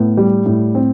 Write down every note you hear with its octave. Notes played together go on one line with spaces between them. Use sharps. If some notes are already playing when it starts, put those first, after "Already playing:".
Already playing: A2 B3
G3
A2
C4